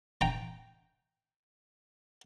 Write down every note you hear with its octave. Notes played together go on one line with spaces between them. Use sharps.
G5 A#5